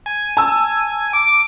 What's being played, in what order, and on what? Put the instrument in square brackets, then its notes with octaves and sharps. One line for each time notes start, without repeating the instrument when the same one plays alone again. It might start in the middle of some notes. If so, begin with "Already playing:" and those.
[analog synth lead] G#5
[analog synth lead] G#5 [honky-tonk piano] A5 E6
[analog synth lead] D6 [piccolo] D7